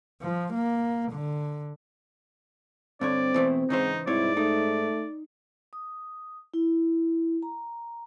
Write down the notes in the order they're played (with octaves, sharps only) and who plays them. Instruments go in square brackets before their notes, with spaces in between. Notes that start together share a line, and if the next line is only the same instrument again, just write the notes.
[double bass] F3
A#3
D3
[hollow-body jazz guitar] G2 D3 C#5 [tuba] C4 [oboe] D5
[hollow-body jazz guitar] B2 E3 A3 [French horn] C5
[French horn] G#2 [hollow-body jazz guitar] C#3 E3 C5 [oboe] D#4
[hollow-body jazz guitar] C2 C4 C#5 [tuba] G#2 [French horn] E4 [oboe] D5
[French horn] A3 [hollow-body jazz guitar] D#4
[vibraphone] D#6
E4
A#5